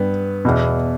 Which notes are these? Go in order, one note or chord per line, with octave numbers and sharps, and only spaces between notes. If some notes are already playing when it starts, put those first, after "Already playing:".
Already playing: G2 B3
E2 B2